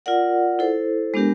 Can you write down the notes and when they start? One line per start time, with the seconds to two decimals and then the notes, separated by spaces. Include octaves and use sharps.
0.06 F4 A#4 D5 F#5
0.59 E4 A4 C5
1.14 G#3 B3 D4 G4 A#4